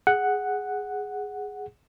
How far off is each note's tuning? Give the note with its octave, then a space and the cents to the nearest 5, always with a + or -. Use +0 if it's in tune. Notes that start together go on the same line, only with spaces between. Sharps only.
G#4 +0 F#5 +0